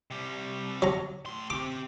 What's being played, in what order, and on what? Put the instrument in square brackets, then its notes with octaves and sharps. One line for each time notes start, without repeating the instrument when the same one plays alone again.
[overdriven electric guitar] C3 G3
[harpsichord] F#3 A#5
[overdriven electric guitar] A2 C6
[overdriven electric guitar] C4 G4 [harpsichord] D6